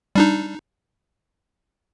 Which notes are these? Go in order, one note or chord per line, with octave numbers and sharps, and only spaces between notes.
G3 D4 D#4